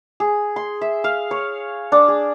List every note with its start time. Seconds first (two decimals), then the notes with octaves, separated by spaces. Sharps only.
0.20 G#4
0.56 C6
0.81 E5
1.04 F5
1.31 C#5
1.92 D4
2.08 G#4